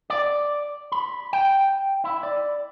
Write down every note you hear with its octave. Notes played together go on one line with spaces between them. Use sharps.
D5
B5
G5
E4
D5